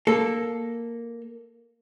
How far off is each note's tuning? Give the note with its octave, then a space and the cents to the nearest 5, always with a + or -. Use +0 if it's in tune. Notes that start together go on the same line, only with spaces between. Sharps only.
A#3 +0 A4 +0